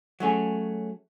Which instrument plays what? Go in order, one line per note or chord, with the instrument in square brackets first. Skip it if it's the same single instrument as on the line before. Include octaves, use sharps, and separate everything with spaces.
[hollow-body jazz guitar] F#3 A3 C#4 G#4